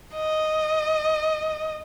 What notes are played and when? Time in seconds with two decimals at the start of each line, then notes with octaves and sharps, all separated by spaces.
0.15 D#5